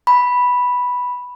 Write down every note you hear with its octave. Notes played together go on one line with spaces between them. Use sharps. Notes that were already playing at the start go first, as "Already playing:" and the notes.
B5